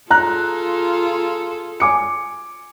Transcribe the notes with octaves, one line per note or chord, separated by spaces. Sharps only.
F4 G#4 A4 A#5 F#6
G#5 D6 C#7